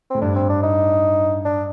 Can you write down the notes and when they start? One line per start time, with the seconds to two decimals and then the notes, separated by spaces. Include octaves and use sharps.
0.10 A2 C4
0.21 G2 D4
0.36 C4
0.49 D4
0.63 D#4
1.45 D4